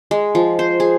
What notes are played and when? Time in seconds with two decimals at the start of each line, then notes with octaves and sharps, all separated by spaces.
0.11 G#3
0.35 F3
0.59 C5
0.80 G#4